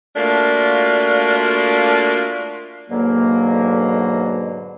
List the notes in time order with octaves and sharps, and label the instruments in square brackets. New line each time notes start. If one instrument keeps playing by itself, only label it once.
[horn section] A3 A#3 D4 F4 F#4
[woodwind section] G#2 B2 D3 F#3 A#3